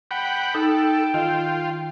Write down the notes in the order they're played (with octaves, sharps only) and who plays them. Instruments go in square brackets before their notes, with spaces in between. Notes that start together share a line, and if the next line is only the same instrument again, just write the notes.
[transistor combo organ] F#5 G5 B5
[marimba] D#4 [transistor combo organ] A4 [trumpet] G5
[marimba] D#3 [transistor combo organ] F4